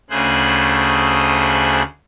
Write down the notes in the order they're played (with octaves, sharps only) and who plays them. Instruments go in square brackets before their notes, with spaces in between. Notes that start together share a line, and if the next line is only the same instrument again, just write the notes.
[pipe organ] D2 C#3 A3 G#4 C5 F#6